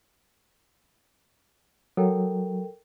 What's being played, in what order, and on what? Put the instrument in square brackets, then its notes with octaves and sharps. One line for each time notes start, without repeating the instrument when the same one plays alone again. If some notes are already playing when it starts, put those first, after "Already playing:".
[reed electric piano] F#3 [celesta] A4 A#4 G5